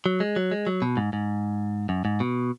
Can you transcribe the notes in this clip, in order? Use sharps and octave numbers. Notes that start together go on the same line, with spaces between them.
F#3
G#3
F#3
G#3
F#3
B2
G#2
G#2
F#2
G#2
B2